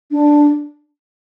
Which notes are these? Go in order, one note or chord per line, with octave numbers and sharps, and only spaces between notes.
D4